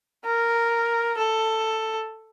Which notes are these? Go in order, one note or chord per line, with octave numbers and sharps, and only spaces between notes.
A#4
A4